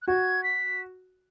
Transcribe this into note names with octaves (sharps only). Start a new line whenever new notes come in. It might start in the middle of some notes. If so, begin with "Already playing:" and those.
F#6
F#4 G#6
B6